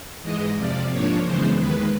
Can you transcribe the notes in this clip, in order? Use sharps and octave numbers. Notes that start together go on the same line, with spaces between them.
G#2 E3 G#3 D#5
F2 C3 F3 D5
G#2 F3 A#3 D4 C#5
F#2 C#3 E3 G#3 B3 C5
D#2 D#3 G#3 B4